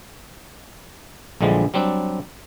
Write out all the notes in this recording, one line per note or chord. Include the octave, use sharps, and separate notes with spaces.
A#1 D3 E3 F3 G3 G#3
F#3 G3 C4 D4